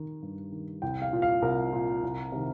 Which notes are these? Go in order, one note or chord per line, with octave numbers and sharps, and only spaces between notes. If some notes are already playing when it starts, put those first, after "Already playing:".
Already playing: D#3
G2
D#3
C2 G5
F5
A#2
F5
C2 A#4
A#2
C2
C3 D#3